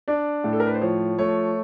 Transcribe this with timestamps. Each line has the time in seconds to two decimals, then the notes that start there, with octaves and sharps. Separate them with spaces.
0.08 D4 D5
0.44 A2
0.53 A4
0.60 A#4
0.67 B4
0.74 C5
0.81 F3 C#5
1.18 A3 C#5